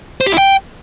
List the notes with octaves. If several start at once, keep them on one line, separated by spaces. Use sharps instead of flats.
C5
G4
E4
G5